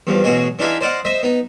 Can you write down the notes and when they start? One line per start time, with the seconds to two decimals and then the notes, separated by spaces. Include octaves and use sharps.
0.07 E2 G2 F3
0.24 A1 B2 F#4 G#4 D#5
0.59 E3 D4 D#4 F4 G#4 E5
0.81 C5 D5 D#5 F5 F#5
1.05 C5 D#5 E5
1.23 B3 D#4